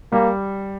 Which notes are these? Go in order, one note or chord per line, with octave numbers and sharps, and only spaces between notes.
G3 A#3